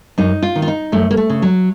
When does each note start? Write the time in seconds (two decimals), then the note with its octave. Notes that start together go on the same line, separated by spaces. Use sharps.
0.18 F#2 D#4
0.42 F4
0.56 D#3
0.62 F4
0.68 D#4
0.92 F#2 A3
1.11 A#3
1.17 A3
1.30 C#3
1.42 F#3